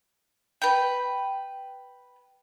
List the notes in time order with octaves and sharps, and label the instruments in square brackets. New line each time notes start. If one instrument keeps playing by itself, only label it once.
[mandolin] B4 G5